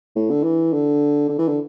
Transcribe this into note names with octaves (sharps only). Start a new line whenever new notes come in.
A2
D3
E3
D3
D3
E3
D3